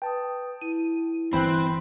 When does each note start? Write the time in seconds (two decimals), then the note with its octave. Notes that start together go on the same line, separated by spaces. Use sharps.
0.02 B4 G5 A5 D#6
0.61 E4 D#7
1.33 G1 E3 C4 G5 B5 F#6